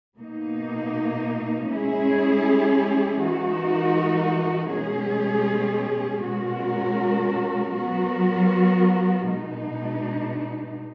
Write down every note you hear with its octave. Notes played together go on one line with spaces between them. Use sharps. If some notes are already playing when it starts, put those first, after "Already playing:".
B2 A#3 D#4
G#3 C#4 E4 G#4
E3 G#3 D#4 F#4 A#4
B2 G#3 C#4 G#4
B2 G#3 C#4 F#4 A#4
F#3 B3 F#4 A#4
B2 G#3 D#4